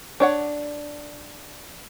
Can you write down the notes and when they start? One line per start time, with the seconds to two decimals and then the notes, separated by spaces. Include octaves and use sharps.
0.20 D4 C#5 F#5